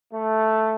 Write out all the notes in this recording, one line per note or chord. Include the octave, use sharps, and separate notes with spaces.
A3